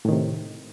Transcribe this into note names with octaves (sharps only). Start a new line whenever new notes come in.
A2 C3 D#3